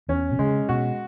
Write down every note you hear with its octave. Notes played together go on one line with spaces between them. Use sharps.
E2 C#4
B2
C#3 G#3
B2 F#4